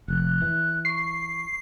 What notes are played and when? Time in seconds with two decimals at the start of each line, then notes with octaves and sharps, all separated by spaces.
0.08 F1 F#6
0.42 E3
0.85 C#6 C7